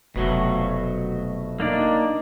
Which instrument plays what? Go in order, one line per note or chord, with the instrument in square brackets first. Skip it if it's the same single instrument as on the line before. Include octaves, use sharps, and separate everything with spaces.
[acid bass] F1 [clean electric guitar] B2 F#3 A3
[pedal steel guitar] A#3 D4 D5 [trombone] D#4